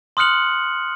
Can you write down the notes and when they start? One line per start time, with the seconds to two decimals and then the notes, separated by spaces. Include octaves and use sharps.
0.17 C6 D#6 F6 F#6 C#7 F#7